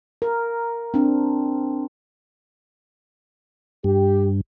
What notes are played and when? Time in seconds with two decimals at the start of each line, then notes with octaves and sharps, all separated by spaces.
0.22 A#4
0.94 C4 D4
3.84 G2 G4